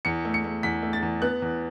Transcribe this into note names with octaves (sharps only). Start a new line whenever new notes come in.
E2 C#7
A3
C#7
A3
E2 B6
A3
A6
E2
B3 F#6
E2